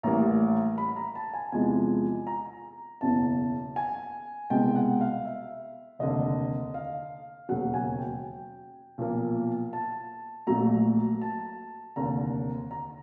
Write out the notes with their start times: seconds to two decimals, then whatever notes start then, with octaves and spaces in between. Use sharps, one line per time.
0.03 A1 A2 E3 G3 A#3 A#5
0.78 B5
0.96 A#5
1.15 A5
1.34 G#5
1.52 E2 C3 F3 G#3 G#5
2.27 A#5
3.01 F#1 E2 B2 A5
3.76 G#5
4.50 C2 B2 G#3 G5
4.76 F#5
5.01 F5
5.25 E5
5.99 F1 D#2 D3 D#5
6.74 F5
7.49 E1 D#2 C#3 F#3 F#5
7.74 G#5
7.99 G5
8.98 B1 A#2 F3 A#3
9.73 A5
10.47 A#1 A#2 F#3 A3 A#5
11.22 A5
11.96 F1 D#2 D3 A#5
12.71 A#5